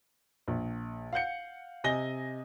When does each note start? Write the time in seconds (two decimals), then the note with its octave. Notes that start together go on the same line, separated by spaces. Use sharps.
0.48 A#1
1.13 F5 F#5 G6 C#7
1.84 C3 D#5 G#5 A#6 G7